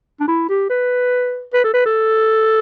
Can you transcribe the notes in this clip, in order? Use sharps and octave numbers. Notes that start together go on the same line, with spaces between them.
D4
E4
G4
B4
B4
A4
B4
A4